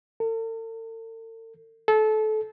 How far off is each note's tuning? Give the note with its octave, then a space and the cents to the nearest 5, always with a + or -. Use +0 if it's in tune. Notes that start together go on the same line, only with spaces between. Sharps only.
A4 +45
A4 -25